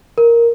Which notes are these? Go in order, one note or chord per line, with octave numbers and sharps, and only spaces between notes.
A#4